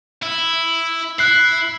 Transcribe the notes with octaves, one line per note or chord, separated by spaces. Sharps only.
E4
E4 F#6 C7